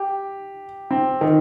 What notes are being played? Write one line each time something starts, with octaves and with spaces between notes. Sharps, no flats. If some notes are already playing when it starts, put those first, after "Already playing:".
Already playing: G4
C4
D#3